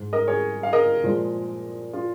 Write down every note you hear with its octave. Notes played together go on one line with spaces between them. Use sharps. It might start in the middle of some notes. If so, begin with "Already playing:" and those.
Already playing: G#2 G#3
A#4 D#5
G#4 C#5
F5
A#4 D#5
A#2 F3 G#3
F4